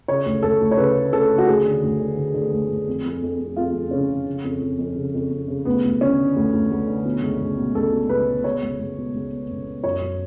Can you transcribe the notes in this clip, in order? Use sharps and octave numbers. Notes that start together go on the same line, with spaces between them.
C#3 C#5
D2
D2 A4
D2
C#5
C#3 B4
C#3
C#3 A4
C#3
F#4
D2 G#4
D3
D2
D3
D3
D3
D2
D2
F2
F2
F2
F2
F2 F4
F2
C#3 C#4
C#3
C#3
F2
F2
F2
C#3
F2
F2
C#3
D2 B3
D2
D3 C#4
D3
D2
D2
D2
D3
B2
C#2
C#2
B2
C#2 A4
B2
C#2 B4
B2
B2 C#5
C#2
C#2
B2
C#2
B2
C#2
B2
F#2 C#5
F#2